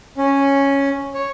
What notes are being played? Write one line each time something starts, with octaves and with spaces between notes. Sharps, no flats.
C#4
C#5